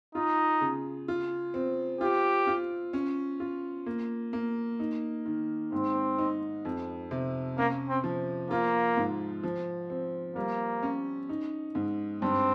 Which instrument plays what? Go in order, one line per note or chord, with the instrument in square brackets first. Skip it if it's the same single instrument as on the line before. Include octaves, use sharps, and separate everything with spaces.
[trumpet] D#4 [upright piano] F4
[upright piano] C#3
F4
C4
[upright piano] F4 [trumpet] G4
[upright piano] F4
C#4
F4
A#3
A#3
D#4
D#3
[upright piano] G#2 [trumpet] C4
[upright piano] D#4
F2
C3
[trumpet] A#3 [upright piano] C#4
[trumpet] C4
[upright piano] F3
[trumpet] A#3 [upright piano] F4
[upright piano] G#2
F3
C4
[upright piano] G3 [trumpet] A#3
[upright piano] C#4
D#4
G#2
[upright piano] G2 [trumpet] C4